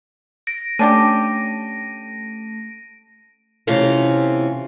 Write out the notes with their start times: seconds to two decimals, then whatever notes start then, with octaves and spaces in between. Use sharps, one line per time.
0.47 A#6 D7
0.79 A3 C#4 D4 G4 D#7
3.67 C3 E3 A3 C4 C#4 F4